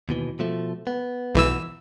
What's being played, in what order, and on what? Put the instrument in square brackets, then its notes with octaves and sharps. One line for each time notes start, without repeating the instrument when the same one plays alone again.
[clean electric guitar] D#2 B2 E3
B2 F3 A3
B3
[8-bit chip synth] B1 E3 E6